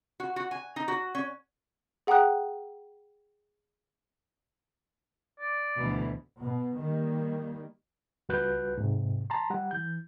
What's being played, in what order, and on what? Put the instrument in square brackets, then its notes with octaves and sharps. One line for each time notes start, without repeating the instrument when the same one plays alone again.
[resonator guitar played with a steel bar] F#4
F#4
G#5
D#4
F#4
C#4
[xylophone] G#4 F#5 G5 A#5 D#6 F#6
[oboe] D5
[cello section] D2 B2 E3
[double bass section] B2
D#3 G3 A#3
[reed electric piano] C#2 G3 F#4 B4 F#6 G6
G#2 C3
A5 A#5 C6
G3 F#5
E3 G6